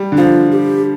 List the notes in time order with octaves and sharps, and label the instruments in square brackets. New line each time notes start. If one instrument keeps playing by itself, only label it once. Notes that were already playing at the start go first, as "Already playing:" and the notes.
Already playing: [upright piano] G3
D3
[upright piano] F3 [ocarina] F4
[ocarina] G4